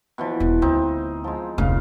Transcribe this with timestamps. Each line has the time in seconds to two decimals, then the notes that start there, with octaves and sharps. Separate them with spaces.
0.18 B2 E3 F3
0.40 E1
0.62 D2 C4 D#4
1.24 F3 G#3
1.58 F1 D2 A#2 C#3 F5